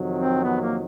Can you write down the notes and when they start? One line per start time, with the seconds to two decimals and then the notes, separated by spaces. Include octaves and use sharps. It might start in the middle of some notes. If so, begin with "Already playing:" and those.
Already playing: F2 C3 D#3 F#3
0.18 C4
0.44 B3
0.61 A#3